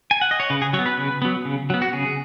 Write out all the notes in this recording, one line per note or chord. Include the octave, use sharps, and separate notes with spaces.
G#5
F#5
D#5
C#5
C#3 B4
G#4
F#3 C#5
B3
B4
C#3
F#3 B3
C#3
F#3 B3
F#4
C#3 G#4